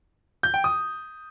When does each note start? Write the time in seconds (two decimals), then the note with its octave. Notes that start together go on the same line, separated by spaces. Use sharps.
0.43 G6
0.54 G5
0.64 D#6